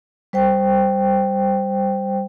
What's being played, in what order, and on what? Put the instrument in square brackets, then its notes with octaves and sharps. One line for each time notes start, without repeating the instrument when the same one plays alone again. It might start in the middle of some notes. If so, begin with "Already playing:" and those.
[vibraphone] G3 C5 G5